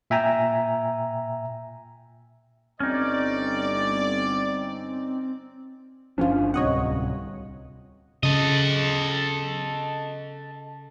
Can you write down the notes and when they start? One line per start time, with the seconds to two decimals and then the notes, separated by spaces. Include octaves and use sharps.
0.10 A#2 E5 G5 G#5 A#5
2.80 G1 C4 C#4 D#4 D5
6.18 G1 F3 C#4 D4 F4
6.54 D1 C2 C3 C#5 D#5 F#5
8.23 C#3 A4 D#5